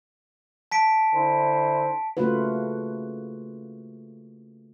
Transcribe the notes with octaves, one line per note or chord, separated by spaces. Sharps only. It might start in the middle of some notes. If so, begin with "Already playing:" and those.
A5 B6 D7
D3 E4 C5
C#3 A3 A#3 F4 F#4 B4